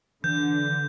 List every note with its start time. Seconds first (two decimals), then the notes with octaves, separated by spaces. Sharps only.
0.24 D3 E3 G6